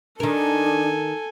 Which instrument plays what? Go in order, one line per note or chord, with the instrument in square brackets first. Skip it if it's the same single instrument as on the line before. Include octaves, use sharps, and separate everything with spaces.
[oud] D#3 A#4 [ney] D4 [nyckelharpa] A4 G#5